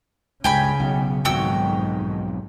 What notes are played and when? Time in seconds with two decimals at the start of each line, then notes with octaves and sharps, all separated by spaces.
0.44 C#2 G2 C#3 G5 G#5 B5
0.80 B1
1.25 B1 F2 G#2 D#3 F#4 G5 E6